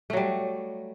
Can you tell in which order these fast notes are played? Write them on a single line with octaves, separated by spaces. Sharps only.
A3 F#3 G3